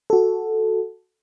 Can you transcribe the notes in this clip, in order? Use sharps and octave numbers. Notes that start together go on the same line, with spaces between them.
F#4 A4